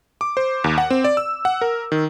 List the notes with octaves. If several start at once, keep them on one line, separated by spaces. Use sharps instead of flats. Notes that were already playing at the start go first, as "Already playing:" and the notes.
D6
C5
D#2
F#5
C4
D5
E6
F#5
A#4
D#3